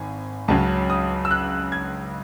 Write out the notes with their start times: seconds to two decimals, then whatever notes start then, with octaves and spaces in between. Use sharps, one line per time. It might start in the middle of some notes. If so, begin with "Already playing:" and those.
Already playing: G#1 G#5
0.48 C#2 C#3 F#3 C#4 A5
0.90 D#6
1.25 E6
1.31 F#6
1.72 G#6